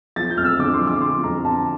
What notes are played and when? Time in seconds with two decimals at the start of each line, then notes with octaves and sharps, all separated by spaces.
0.16 F3 A6
0.30 G6
0.38 F2 F6
0.45 E6
0.59 D3 D6
0.74 C6
0.81 F2
0.87 D6
1.01 F3 C6
1.23 F2 A#5
1.45 D3 A5